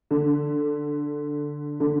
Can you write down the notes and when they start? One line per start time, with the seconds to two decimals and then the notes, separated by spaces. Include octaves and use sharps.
0.11 D3
1.80 D3